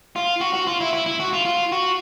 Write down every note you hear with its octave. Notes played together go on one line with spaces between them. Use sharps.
F4
F#4
F#4
F4
E4
E4
E4
F#4
F4
F4
F#4